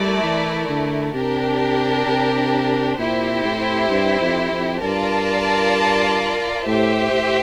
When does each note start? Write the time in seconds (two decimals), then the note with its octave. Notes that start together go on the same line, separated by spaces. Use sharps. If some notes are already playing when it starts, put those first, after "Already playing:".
Already playing: G3 A3 E4 A#4 D5
0.23 E3
0.69 D3
1.14 C3 D4 G4 A#4
2.07 C3
2.98 A#2 C4 E4 G4 C5
3.44 A2
3.90 G2
4.20 F2
4.51 F2
4.82 G2 F4 A#4 D5 A5
6.66 A2 G4 C5 E5
7.12 A2